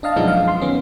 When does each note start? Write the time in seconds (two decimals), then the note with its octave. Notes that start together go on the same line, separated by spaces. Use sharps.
0.03 D4 D#5 F5 A5
0.16 F#2 B2 F3 G#3 B3 D#4
0.28 F5
0.48 C6
0.61 D#3 B3 C#4